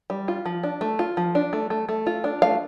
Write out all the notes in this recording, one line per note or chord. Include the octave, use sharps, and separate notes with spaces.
G3
F4
F3
D4
A3
F4
F3
D4
A3
A3
A3
F4
D4
A3 F5